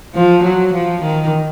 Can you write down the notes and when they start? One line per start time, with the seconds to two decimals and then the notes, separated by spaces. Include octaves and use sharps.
0.14 F3
0.44 F#3
0.73 F3
1.02 D#3